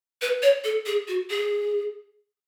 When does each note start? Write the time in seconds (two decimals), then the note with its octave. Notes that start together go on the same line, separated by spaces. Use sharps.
0.22 B4
0.42 C#5
0.64 A4
0.86 G#4
1.08 F#4
1.30 G#4